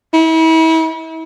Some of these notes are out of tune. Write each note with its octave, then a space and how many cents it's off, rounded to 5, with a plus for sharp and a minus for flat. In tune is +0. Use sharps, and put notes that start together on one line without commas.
E4 -35